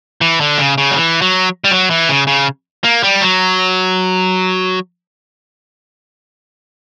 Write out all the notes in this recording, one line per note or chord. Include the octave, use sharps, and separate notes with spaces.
E3
D3
C#3
C#3
F#3
E3
F#3
G3
F#3
E3
C#3
C#3
A#3
G3
F#3